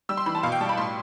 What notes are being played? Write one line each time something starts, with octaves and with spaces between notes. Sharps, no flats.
G3 E6
C6
E3 B5
A5
B2 F5
G5
G3 A5
B5
A2 C6